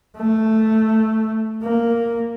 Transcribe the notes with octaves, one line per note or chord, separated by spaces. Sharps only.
A3
A#3